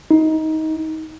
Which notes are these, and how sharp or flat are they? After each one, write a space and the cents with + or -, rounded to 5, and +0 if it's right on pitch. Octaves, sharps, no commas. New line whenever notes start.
D#4 +20